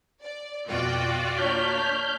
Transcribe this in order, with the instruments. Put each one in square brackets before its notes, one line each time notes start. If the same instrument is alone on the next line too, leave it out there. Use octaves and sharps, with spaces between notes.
[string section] D5
[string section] F2 B2 G5 [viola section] F4 F#4 D5
[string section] A#3 D4 B6 [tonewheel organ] C#5 F6 G6